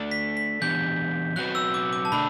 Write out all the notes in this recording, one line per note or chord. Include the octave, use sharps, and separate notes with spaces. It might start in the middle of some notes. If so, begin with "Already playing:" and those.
Already playing: A3 D4 A4 D5
B6
B6
E3 B3 D4 G4 G6
F#3 C4 F#4 B4 F#6
E6
D6
D6
A5
B2 A3 D4 B5